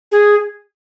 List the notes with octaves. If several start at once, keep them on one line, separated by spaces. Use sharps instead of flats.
G#4